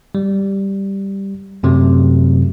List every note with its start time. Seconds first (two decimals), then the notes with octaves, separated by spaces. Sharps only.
0.15 G3
1.63 F#2 C3 F#3 A3